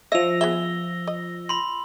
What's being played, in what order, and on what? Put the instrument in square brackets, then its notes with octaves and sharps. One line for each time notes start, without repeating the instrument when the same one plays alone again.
[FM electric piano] F3 A#6 [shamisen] C#5 D#5 E5 [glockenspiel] E6 F7
[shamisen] B3 G#4 E5 [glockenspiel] G7
[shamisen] D#5
[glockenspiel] B5 C6